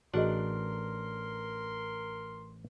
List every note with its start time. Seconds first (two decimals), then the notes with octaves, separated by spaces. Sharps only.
0.14 A1 D4 F#4 G#4 A#4 D#5 F#5 C6